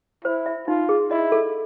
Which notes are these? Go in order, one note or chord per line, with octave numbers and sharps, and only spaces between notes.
E4 C5
E5
D#4 F4
G#4
E4 D#5
A4